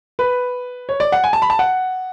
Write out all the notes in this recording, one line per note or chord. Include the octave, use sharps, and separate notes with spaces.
B4
C#5
D5
F#5
G#5
A5
B5
A5
F#5